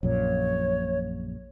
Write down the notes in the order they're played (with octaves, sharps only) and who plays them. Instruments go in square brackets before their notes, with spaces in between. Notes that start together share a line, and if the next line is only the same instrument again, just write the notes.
[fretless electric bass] A#1 F#2 A#2 [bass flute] C#5